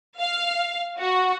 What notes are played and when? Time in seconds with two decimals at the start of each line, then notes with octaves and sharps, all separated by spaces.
0.17 F5
0.98 F#4